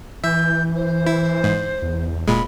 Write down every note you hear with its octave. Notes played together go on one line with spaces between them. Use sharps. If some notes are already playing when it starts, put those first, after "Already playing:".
E3 E5 G6
C5
E4
G#2
E2
E1 A#2 G#3 B5